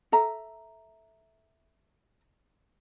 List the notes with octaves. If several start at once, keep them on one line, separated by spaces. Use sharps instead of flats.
A4 E5 A#5